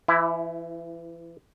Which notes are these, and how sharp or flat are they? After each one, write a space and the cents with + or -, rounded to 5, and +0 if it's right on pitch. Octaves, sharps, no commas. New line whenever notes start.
E3 +30 E4 +0